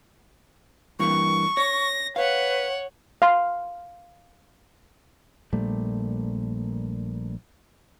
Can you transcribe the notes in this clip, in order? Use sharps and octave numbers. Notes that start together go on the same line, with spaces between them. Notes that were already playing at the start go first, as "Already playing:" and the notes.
G2 E3 A#3 C#6
C#5 A#6
B4 C#5 F5 F#5
F5 C6
A#1 A#2 G3 A3